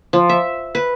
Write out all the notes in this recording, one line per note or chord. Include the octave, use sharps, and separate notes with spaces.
F3
E5
B4